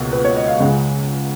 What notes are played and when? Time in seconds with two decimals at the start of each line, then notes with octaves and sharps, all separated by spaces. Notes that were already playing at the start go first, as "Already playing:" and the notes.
Already playing: C#2 B2 A#3
0.13 B4
0.25 C#5
0.36 D#5
0.48 F5
0.60 C#2 C#3 G#3 F#5